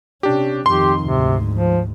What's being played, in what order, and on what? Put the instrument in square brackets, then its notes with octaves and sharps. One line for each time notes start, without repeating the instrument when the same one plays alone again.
[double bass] C3 C#4 [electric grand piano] D4 G4
[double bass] F2 D#3 [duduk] G4 [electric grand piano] C6
[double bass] D2 G#2 [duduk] C3
[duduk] F3